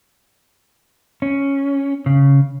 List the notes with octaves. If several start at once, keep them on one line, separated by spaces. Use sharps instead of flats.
C#4
C#3